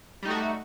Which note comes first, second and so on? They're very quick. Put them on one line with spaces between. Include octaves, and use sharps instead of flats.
G3 D#4 A3 F#4